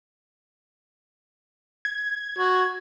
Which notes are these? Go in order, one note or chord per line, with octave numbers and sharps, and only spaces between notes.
G#6
F#4